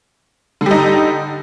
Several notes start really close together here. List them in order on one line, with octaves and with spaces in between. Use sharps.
D3 G3 D#4